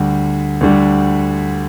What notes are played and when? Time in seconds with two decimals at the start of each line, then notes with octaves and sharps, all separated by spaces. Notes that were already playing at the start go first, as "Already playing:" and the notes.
Already playing: D2 D3 G3
0.61 D2 D3 G3